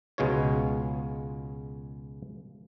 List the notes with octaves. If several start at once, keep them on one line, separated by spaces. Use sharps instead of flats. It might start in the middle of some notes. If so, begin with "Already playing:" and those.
C#2 B2 G#3 F4 C#5